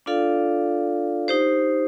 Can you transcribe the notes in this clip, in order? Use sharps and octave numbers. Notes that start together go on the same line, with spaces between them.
D4 F4 A4 D5 F5
D#4 G4 C5